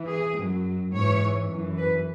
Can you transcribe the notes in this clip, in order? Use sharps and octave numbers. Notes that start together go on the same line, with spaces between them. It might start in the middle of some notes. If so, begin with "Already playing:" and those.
Already playing: E3
G#4
F#2 F#3
G#2 E3 C#5
F#2 E3
B4